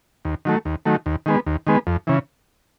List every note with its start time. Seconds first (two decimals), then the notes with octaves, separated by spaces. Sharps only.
0.25 D#2
0.45 D#3 F#3 A3
0.65 D#2
0.86 D#3 F#3 A3
1.06 D#2
1.26 D#3 G#3 B3
1.47 D#2
1.67 D#3 G#3 B3
1.87 F2
2.07 C#3 E3